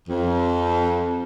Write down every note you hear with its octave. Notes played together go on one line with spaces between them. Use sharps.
F2